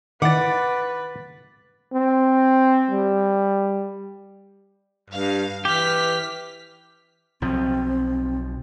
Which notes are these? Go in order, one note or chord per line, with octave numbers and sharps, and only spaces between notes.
D#3 E3 B4 D5 F#5 D6 A6
C4
G3
G2 F5
E3 G4 F6 B6
B1 F3 C4